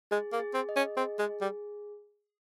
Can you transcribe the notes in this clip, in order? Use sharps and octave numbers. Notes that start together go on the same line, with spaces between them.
G#3 G#4
A#3
G#4
C4
D#5
C#4
C4 G#4
G#3
G#4
G3